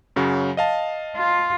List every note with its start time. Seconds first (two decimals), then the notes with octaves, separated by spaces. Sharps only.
0.16 F#2 C#3 F#3
0.57 D#5 F5 A5
1.16 F4